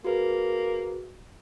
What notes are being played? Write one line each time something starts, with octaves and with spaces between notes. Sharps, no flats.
A#3 F#4 G#4 B4